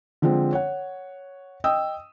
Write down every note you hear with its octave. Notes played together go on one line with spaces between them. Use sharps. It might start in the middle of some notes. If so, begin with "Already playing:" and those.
D3 F3 G#3 C4
C#5 F#5
D#5 G5 D#6 E6